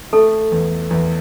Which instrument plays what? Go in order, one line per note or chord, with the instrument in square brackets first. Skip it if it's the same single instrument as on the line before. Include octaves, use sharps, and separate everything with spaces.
[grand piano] A3 [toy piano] A4
[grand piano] E2
E2